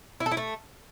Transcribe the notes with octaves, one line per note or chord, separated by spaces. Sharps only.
E4
A4
E4
A3